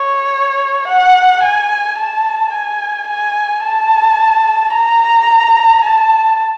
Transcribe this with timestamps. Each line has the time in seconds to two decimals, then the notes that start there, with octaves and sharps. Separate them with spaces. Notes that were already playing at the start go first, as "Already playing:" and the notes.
Already playing: C#5
0.87 F#5
1.43 G#5
1.98 A5
2.53 G#5
3.08 G#5
3.63 A5
4.73 A#5
5.84 A5